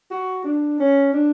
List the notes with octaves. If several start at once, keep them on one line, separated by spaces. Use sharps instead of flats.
F#4
D4
C#4
D4